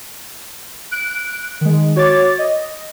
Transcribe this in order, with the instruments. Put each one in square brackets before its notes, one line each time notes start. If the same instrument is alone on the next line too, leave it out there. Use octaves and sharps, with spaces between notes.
[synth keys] F#6 D7
D#3 G#3
F#4 C#5 D6 A6
D#5